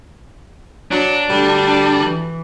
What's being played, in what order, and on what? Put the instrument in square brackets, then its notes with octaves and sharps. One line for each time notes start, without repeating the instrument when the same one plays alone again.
[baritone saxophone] F#3 [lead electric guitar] D4
[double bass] D2 D3 [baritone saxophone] G3
[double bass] E3